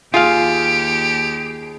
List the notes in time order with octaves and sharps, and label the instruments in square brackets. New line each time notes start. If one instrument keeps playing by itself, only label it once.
[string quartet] D#2 [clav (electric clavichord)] F4 F5 [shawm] G4 [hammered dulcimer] G#4